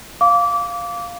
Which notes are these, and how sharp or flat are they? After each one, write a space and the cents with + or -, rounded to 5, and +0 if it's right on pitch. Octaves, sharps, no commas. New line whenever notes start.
F5 +0 D6 -25